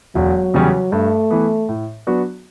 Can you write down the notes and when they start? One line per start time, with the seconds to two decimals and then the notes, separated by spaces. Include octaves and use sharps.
0.15 E1 F#3
0.54 E2 C#3 G3 C#4
0.92 G2 A3
1.30 E3 B3
1.69 A2
2.07 F#3 B3 D4 F#4